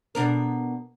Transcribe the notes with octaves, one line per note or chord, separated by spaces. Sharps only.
B2 D4 A#4